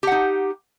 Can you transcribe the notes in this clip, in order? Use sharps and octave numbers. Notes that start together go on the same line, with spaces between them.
D#4 G4 F#5